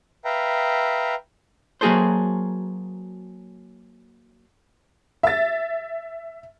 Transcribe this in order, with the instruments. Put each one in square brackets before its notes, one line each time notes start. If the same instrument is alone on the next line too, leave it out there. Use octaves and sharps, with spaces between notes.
[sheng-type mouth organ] B4 E5 F5 G5 A#5
[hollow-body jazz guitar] F#3 A#3 F#4 G#4 A4 C5
[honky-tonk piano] E5 A6